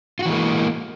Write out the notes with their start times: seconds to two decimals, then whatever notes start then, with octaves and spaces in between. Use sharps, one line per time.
0.19 F4
0.22 F#4
0.25 E3
0.29 G#3
0.32 A#3